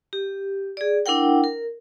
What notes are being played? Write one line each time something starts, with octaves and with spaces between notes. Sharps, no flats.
G4
G#4 D5
D4 E4 A#4 F#5 G5
A#4